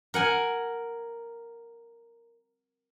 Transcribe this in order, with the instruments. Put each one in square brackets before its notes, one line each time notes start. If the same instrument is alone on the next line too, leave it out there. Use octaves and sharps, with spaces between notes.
[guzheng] A#4 F#5 G#5